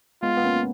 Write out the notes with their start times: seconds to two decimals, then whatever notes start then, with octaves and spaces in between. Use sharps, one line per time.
0.23 G#3 B3 F4
0.37 B3
0.44 A#3 C#4